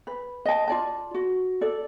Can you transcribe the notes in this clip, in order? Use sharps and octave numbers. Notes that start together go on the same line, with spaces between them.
B4
D#5 A5
F4 D5 A5
F#4
A4 D5